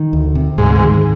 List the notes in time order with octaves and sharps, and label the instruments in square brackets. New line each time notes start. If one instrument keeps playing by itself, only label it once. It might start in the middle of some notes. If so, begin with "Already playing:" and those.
Already playing: [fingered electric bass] D#3
D2
C3
[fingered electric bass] D2 [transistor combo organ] G#2
[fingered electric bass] D#3